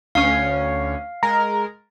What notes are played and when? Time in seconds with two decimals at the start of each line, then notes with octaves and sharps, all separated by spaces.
0.15 D2 C#4 F5 C7
1.23 G#3 A#4 A#5